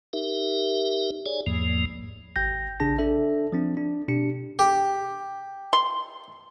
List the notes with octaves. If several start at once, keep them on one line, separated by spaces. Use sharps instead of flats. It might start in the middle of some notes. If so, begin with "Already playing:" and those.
D#4 G4 A#4 E5
G#4 C#5 D5 G#5
E2 G#2 F3 A#3
G#1 G5 G6 A#6
A1 C#3 D4 G#4 A5 A#6
D4 A4 E5
F3 C4 D4
D4
B2 D4 G4 C#7
G4
C6